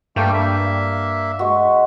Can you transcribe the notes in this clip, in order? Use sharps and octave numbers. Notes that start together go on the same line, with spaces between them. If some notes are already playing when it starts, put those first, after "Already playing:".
G2 A3 A#3 G5
A#3 E5
G#3 F#4